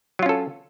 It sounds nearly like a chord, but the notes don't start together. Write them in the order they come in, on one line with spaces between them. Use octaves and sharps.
F#3 F4 C#4 A4